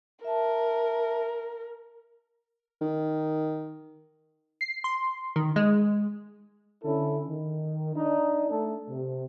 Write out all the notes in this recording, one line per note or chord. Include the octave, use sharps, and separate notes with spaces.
A#4 E5 A5
D#3
C7
C6
D#3
G#3
D3 C#4 E4 A4
D#3
D4 D#4
A3 A4
C3